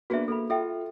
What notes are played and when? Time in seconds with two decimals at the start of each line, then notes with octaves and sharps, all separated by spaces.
0.10 A#3 B3 D4 F#4 G#4 E5
0.28 A#3 A4 B5
0.50 F4 A4 E5 G5